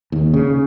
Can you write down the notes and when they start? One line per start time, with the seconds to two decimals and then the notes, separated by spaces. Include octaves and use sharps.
0.12 D#2
0.34 C#3